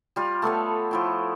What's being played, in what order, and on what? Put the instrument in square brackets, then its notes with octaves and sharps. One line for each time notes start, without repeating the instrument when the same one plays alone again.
[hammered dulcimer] G3 F4
A3 B3 A4 C#5
F3 E4 G5